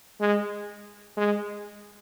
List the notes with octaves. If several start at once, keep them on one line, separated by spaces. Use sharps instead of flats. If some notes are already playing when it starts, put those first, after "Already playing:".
G#3
G#3